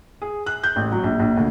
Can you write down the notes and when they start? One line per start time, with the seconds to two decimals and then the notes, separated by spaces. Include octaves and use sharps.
0.22 G#4
0.46 F#6
0.63 G6
0.76 A1
0.92 F#3
1.04 A#1
1.20 A#1
1.37 D2